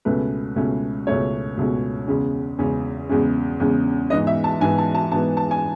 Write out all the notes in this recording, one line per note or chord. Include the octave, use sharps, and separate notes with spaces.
C#2 B2 A3 C#4 B4
C#2 B2 A3 C#4
C#2 B2 A3 C#4 C#5
C#2 B2 A3 C#4
E2 C#3 G#3 C#4
E2 C#3 G#3 C#4
E2 C#3 G#3 C#4
E2 C#3 G#3 C#4
G#2 E3 B3 D#5
E5
A5
G#2 E3 B3 G#5
A5
A5
G#2 E3 B3 A5
A5
G#5